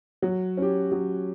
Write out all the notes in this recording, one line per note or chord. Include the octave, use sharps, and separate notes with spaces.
F#3
C#4 G4
F#3